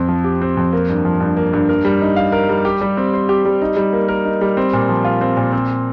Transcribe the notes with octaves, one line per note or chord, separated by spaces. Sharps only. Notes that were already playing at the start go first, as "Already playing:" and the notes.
Already playing: F2 C4
F3
G4
C4
F2
A#3
G2
F3
G2
A#3
G2
A#4
G3
D#4
F5
A#4
G3
G4
G3
C4
C5
G4
G3
D#4
G3
A#3
A#4
D#4
G3
C4
A#2
F3
F4
C4
A#2
C4